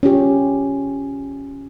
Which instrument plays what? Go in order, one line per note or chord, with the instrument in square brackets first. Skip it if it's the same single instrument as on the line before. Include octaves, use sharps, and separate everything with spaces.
[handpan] C#4 F4 G4 C#5